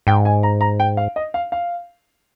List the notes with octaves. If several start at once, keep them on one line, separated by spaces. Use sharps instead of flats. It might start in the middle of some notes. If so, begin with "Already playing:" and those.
G#2 G5
G#5
A#5
A#5
G5
F5
D#5
F5
F5